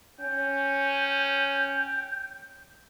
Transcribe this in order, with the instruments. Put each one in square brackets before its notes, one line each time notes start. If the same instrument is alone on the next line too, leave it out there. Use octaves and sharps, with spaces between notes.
[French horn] C#4 [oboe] G5